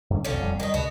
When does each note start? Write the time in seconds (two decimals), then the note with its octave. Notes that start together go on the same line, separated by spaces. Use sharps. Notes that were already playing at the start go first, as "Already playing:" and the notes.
0.10 G2 D3 C#4
0.25 B1 F2 D3 F#3 C#4
0.41 D#1 F2 G3
0.60 D#3 G3 D#4
0.74 C#2 B2 B3 F#4